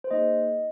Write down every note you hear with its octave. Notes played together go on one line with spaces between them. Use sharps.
C5
A#3 D#4 G#4 D#5